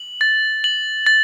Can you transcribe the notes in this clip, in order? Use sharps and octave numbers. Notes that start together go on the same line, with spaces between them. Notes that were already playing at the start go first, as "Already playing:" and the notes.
Already playing: F#7
A6
F#7
A6